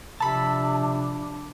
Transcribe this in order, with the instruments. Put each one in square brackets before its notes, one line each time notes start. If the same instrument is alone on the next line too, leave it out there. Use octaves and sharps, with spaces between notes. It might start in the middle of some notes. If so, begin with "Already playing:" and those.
[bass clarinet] C3 [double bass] F3 D4 [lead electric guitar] A5 [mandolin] B5 E6